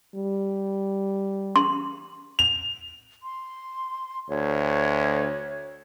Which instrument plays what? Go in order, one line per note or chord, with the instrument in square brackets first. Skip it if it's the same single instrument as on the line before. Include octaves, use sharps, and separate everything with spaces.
[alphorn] G3
[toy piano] C6
[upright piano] F7
[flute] C6
[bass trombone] D2 [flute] C#5